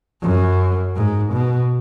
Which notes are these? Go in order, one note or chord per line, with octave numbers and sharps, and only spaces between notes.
F#2
G#2
B2